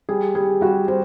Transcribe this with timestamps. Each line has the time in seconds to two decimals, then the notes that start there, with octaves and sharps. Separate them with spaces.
0.09 G3 G#4
0.35 G3 G#4
0.61 G3 F#4
0.88 G3 C5